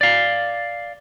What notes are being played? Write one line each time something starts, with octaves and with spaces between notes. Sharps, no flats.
D5 F5